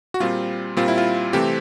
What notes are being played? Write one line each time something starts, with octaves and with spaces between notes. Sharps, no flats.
F#4
A#2 G3 C4 F4
A#2 G3 C4 F4
E4
F4
C3 E3 A3 C4 G4